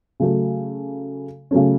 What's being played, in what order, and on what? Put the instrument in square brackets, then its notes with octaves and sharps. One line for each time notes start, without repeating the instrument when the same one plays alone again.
[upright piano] C#3 F#3 A3
C#3 F#3 A3 C#4